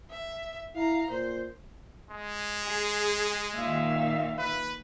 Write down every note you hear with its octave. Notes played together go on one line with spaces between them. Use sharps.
E5
E4 F5 A#5
A#2 C5
G#3
G#4
A#2 D#3 E5 F5
B4